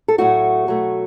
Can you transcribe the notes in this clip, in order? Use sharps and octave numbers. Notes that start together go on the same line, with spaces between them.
A4
A2 F#3 A3 F#4
B2 F#3 A3